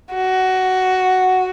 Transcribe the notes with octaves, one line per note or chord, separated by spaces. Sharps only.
F#4